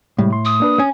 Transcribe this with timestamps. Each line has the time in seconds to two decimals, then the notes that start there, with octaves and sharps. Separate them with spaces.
0.18 A2 C3 G3 G#3
0.33 C6
0.45 D#6
0.60 A#3 D4 B4
0.79 C#4 G#5